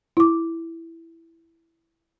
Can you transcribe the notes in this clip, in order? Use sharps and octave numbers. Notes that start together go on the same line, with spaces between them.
E4 D6